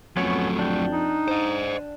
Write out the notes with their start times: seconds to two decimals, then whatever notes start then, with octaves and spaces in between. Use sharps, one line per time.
0.17 F2 F#3 A3 B3 C#4 C#5
0.59 D4 G5
0.92 D#4
1.28 C5 D#5